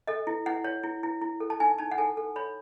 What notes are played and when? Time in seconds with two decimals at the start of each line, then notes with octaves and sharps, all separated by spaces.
0.07 A4 D#5
0.27 E4
0.46 E4 F#5
0.64 C#5
0.83 E4
1.03 E4
1.22 E4
1.40 A4
1.50 A5
1.60 D#4 G#5
1.78 D#4 A5
1.91 F#5
1.98 A4 G#5
2.17 A4
2.36 C#5 B5